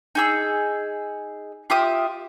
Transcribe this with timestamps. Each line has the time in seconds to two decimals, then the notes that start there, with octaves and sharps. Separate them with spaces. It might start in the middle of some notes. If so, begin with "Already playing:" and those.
0.15 D#4 G#4 E6
1.70 F4 G4 E5 D#6